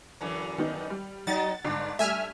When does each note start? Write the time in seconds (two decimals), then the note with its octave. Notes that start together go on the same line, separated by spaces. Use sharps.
0.21 F#2 D3 E3
0.58 D#3 B3 D#4
0.90 G3
1.27 F#3 D#4 D#5 F#5 A6
1.65 G1 G#2 D4
1.99 G3 A3 E5 G#5 F6